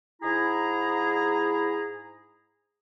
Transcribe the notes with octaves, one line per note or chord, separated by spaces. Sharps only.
G#2 E4 G#4 A#5